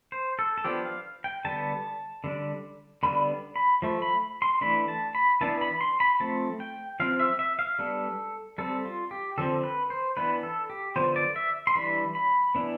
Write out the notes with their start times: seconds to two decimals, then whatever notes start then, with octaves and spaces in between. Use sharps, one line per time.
0.12 C5
0.39 A4
0.58 A4
0.65 F3 B3 D4 G4
0.85 F5
1.24 G5
1.45 D3 G3 B3 A5
2.24 D3 G3 D4
3.03 D3 G3 B3 D4 B5
3.56 B5
3.82 F3 A3
4.02 B5
4.42 C6
4.61 E3 A3 D4 B5
4.88 A5
5.15 B5
5.41 E3 B3 D4 A5
5.61 B5
5.81 C6
6.00 B5
6.20 F3 A3 C4 A5
6.60 G5
7.00 F3 C4 F5
7.20 E5
7.39 E5
7.59 F5
7.79 G3 B3 D4 A4
8.58 G3 C4 A4
8.85 F4
9.11 G4
9.38 D3 F3 C4 A4
9.64 B4
9.90 C5
10.17 E3 B3 D4 B4
10.43 A4
10.70 G4
10.96 D3 F3 B3 C5
11.16 D5
11.36 E5
11.67 C6
11.75 E3 G3 D4 B5
12.15 B5
12.55 E3 B3 D4